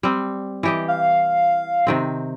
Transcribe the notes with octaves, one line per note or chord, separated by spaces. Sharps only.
G3 C4
E3 G4 D#5
F5
C3 D#3 C4